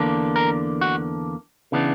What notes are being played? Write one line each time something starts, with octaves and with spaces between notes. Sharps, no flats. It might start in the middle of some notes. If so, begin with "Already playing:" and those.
Already playing: E2 D3 A#3 D4
A#4
F#4
C#3 E3 B3 D4